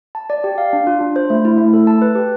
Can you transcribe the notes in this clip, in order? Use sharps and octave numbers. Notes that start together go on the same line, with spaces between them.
A5
D5
G4
F5
D4
F4
D4
C5
A3
E4
A3
A4
A5
B4
G4